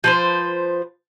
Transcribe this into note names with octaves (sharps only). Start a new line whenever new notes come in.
F3 B4 C5